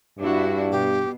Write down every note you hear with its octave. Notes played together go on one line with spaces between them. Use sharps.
G2 D4 E4 F#4
B2 G4